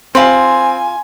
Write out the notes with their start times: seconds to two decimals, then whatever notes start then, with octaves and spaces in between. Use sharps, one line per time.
0.15 C4 F4 G#5 B5 C6